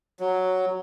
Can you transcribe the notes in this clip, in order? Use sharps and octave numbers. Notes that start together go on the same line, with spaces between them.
F#3